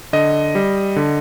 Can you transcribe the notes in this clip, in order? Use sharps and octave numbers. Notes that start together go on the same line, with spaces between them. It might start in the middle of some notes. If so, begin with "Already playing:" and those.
D3 D#5
G3
D3